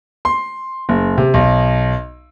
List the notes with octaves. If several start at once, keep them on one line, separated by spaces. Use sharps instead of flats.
C6
F#1
C3
B1